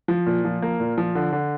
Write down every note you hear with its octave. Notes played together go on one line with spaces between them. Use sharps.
F3
A#2
F3
A#3
A#2
F3
D3
D3